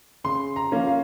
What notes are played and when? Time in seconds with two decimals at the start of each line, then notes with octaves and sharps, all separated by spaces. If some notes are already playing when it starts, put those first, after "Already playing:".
0.24 C#3 C6
0.56 A#5
0.72 F3 A#3 C#4
0.87 F5